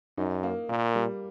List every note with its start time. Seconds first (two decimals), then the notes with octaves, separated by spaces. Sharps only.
0.17 F#2 D#4
0.43 A#3
0.69 A#2 A#3
0.95 G3